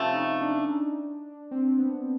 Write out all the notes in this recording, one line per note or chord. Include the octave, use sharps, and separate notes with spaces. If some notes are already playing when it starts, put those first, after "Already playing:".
Already playing: C3 F3 A3 C#4
D#4
D4
C4
B3